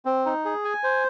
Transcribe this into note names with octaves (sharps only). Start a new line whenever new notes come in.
C4
D#4
G#4
G#5
C5